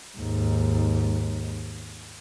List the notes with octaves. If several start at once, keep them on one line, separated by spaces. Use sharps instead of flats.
D#2 G#2